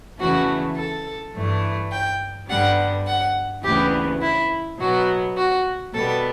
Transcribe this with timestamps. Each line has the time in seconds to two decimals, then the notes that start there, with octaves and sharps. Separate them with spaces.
0.20 E2 C#3 E3 A3 F#4
0.77 A4
1.35 G2 E3 A3
1.92 G5
2.50 G2 D3 G3 B3 F#5
3.07 F#5
3.64 D2 C#3 E3 B3 G4
4.21 E4
4.79 B2 F#3 B3 F#4
5.36 F#4
5.94 B2 G3 B3 A4